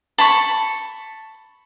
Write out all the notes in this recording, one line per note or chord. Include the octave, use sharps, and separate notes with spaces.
A5 B5 C#6